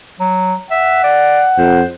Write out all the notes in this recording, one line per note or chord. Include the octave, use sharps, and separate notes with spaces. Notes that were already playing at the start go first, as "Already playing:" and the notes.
F#3
E5 F#5
D5
F2 C5